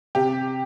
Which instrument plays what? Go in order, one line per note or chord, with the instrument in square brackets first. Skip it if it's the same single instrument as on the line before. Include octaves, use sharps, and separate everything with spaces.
[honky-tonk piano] C3 G4